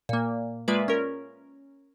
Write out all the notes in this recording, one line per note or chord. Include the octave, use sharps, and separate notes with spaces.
A#2 A#3
G#3 A#3 F4 B4 D5 E5
C#4 A#4